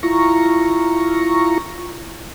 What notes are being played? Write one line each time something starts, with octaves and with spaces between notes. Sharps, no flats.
E4 F4 A#5 C#6